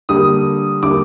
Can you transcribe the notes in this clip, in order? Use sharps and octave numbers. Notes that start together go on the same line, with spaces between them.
D3 G3 A#3 D#6
D3 G3 A#3 D6